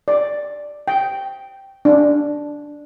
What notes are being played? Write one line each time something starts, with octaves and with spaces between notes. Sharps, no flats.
D5
G5
D4